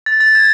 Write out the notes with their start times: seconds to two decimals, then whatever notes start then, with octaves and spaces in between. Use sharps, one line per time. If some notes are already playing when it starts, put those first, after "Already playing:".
0.06 A6
0.20 A6
0.35 G#6